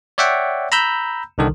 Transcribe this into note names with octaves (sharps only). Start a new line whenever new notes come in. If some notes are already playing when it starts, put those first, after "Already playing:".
C#5 D5 E5 F#5 G5
A#5 B5 E6 G6
C2 D3 D#3 A4